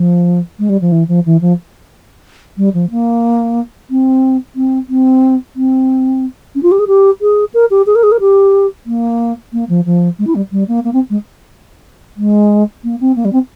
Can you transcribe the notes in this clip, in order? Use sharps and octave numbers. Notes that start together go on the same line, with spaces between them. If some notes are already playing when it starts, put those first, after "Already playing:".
Already playing: F3
G#3
G3
F3
E3
F3
E3
F3
G3
F3
A#3
C4
C4
C4
C4
C#4
F4
G4
G#4
G4
G#4
A#4
G4
G#4
A#4
G#4
A#4
G4
A#3
A#3
F3
F3
G#3
E4
G3
G3
A#3
A#3
C4
G#3
G#3
A#3
C4
A#3
G3
C4